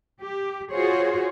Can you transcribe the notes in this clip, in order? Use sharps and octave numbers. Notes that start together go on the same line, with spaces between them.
G4
F4 F#4 G#4 C5 C#5